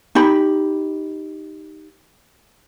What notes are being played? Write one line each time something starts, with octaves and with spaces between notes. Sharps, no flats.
D#4 G4 B5